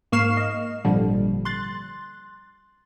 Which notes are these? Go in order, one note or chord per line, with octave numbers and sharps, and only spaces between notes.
G#2 A#3 C#6 F6 C7 E7
D#5
G#1 A#2 D3 F3 G3
C6 F#6 A6